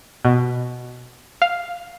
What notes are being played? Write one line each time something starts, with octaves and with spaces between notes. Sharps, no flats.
B2
F5